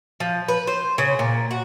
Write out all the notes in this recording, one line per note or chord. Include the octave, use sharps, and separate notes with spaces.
F3
B4
C5
C#3
A#2
F#4